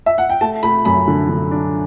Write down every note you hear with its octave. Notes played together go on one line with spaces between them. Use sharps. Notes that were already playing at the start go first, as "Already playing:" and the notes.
E5
F#5
G5
A3 A5
A3 B5
F#2 B5
D3
D3
D4